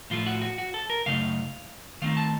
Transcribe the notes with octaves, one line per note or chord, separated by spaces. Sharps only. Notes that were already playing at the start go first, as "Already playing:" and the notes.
A2 F3 A3 F4
F#4
F#4
F#4
A4
A#4
F#2 C#3 A3 D#4 F5
D#3 A3 C4 D#4 F5
A5